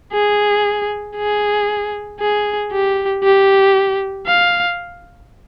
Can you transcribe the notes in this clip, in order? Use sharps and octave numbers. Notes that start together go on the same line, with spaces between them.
G#4
G#4
G#4
G4
G4
F5